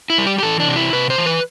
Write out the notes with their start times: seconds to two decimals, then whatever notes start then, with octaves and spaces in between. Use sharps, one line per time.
0.10 E4
0.18 G3
0.27 G4
0.38 G4
0.43 E3 A4
0.60 D4
0.68 C3
0.76 E4
0.93 C3 B4
1.10 C5
1.18 E3
1.26 B4